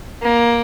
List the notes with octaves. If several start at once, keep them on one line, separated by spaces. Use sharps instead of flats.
A#3